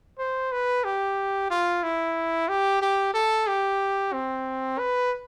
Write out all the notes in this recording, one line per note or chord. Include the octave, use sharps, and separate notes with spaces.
C5
B4
G4
F4
E4
G4
G4
A4
G4
C4
B4